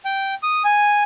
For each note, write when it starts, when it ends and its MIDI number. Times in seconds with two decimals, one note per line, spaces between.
0.05 0.34 79
0.43 0.63 87
0.64 1.03 80